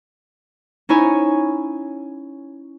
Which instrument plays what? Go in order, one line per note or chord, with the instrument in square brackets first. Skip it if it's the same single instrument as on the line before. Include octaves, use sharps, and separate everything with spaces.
[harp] C#4 D#4 E4 C#5 G#5